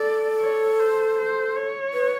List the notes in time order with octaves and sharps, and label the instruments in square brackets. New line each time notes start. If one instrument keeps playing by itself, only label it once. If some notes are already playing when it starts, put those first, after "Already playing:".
Already playing: [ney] A4 [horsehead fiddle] D5
[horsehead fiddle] C#5
C5
C5
C#5
[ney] B4